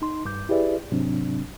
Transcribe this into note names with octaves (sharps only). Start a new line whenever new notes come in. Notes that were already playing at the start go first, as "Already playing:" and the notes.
D#4 C6
G2 D6 G6
E4 G4 G#4 B4 D5 E5
G#2 C3 F#3 C4 D4